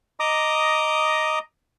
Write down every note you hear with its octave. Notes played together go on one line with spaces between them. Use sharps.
D#5 A#5 D6 D#6